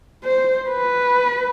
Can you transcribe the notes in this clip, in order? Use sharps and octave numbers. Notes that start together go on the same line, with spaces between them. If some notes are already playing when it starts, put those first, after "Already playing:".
C5
B4